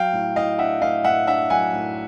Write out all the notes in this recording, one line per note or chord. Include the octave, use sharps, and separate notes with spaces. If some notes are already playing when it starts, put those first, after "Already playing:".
Already playing: F#3 F5 G5
A2
A2 D#5 F5
D4 E5 F#5
A2 D#5 F5
A2 E5 F#5
D4 E5 F#5
F#3 F#5 G#5
A2